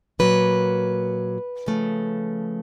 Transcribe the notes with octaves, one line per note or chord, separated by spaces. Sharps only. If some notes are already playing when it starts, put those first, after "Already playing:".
A#2 F#3 A#3 B4
C#3 F3 A3